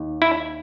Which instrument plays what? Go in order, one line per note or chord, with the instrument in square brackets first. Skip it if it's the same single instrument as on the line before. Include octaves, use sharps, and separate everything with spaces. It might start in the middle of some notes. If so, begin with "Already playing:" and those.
Already playing: [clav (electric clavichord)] D#2
E4